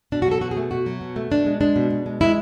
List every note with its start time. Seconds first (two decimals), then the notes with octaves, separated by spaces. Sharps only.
0.12 B2 D4
0.22 F#4
0.27 F#3 A4
0.41 B2 F#4
0.51 G#4
0.57 A3
0.71 B2 F#4
0.86 F#3
1.01 B2
1.16 A3
1.30 B2 D4
1.46 G#3
1.61 G#3 D4
1.76 B2
1.90 B2
2.06 G#3
2.21 G#3 E4